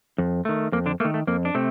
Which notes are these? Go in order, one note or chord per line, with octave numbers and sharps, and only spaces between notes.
F2
D#3 A3
F2 A#3
D3 D4
D#3 A3 A#3
A3
F2 A#3
D4
C3 A3 C4